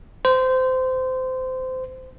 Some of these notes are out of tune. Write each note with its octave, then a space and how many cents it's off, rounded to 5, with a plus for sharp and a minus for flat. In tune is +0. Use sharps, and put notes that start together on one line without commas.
C5 -20